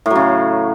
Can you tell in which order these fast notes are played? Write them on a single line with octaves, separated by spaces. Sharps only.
A2 F#3 C#3